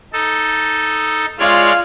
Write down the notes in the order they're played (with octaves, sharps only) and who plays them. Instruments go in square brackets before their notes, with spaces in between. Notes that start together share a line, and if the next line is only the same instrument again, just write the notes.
[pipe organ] D#4 A4
[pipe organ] G#3 C#5 D5 [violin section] F4 F6